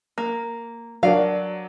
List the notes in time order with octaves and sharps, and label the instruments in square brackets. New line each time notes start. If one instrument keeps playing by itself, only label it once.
[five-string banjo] A#3
[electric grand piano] F#3 D5 [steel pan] D4 F#4 A#4 [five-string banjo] F5